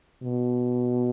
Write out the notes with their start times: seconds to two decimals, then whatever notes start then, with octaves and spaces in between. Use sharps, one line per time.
0.23 B2